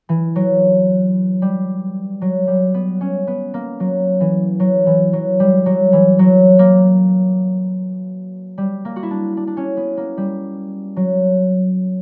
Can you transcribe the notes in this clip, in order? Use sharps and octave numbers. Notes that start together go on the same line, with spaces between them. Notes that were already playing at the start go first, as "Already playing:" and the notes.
E3
F#3
G3
F#3
G3
B3
C#4
B3
A#3
F#3
E3
F#3
E3
F#3
G3
F#3
E3
F#3
A#3
G3
A#3
F#4
E4
D4
D4
D4
C#4
B3
A#3
G3
F#3